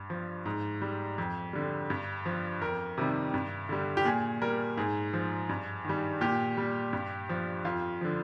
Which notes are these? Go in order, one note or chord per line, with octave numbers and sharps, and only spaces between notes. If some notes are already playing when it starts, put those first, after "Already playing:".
Already playing: G2
F3
G#2
G3
F2
D3 G3
G2
F3
F2 A#4
C3 D#3 G3
G2
D3 G3
G4
A#2 G#4
G3 A#4
G#2 G#4
F3
G2
D#3 G3
A#2 G4
G3
G2
F3
F2 F4
D3 F3